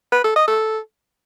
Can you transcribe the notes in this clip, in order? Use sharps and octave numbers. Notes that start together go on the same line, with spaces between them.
B4
A4
D#5
A4